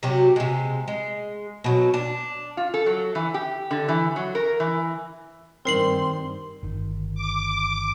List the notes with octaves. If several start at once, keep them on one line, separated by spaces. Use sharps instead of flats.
C3 F#3 F#4 G4
C3 G#3
G#3
B2 F#3
D4
F4
A4
F#3
E3
G4
D3
E3
F#3
A#4
E3
G2 D#3 G3 C4 A#4 C6 C7 F#7
G1 D#3
D6